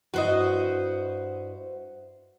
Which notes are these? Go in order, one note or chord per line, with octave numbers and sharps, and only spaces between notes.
G2 E4 F#4 C5 D#5